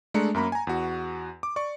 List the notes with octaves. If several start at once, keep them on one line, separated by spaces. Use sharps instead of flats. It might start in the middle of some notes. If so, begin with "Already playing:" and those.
G#3 A3 D4 A#5 C#7
F#2 A#3 A#5 B5
G#5 A#5
E2 F#4
D6
D5 C#6